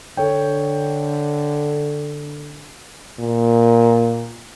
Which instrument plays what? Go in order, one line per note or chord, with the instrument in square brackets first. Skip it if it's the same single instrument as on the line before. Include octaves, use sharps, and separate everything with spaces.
[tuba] D3 [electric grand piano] A4 C#5 G5
[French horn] A#2